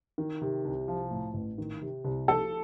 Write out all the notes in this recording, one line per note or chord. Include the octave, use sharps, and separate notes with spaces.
D#3
C3
C2
F3
A2
A1
D#3
C3
C2
F3 A4